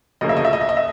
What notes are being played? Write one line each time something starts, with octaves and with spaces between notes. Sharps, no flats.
D2 C#3 F3 A#3 D#5
E5
D#5
E5
D#5
E5
D#5
E5